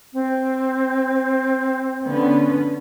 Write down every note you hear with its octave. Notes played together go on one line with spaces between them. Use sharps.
C4
D3 B3 C#4